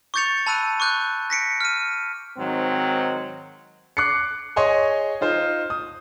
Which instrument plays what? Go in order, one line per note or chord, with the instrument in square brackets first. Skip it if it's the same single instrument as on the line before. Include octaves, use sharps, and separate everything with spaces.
[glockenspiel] C#6 D6 G6 A6 C#7 F7
A5 B5 E6 F#6 D#7
C#6 D6 F#6 G6
A#6 B6 C#7 D7
F6 D#7
[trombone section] G#2 D#3 F#3 C4
[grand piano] D6 F#6 C7 C#7
G#4 C#5 D#5 G#5 C6 C#6
D#4 F4 C5
D#6